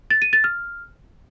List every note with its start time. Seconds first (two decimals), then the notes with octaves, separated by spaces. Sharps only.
0.10 A6
0.22 D#7
0.33 A6
0.44 F6